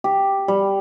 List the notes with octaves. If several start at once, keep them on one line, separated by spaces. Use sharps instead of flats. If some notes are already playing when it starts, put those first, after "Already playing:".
G4
G3